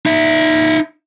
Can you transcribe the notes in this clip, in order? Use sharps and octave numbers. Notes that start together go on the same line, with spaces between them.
D#4 E5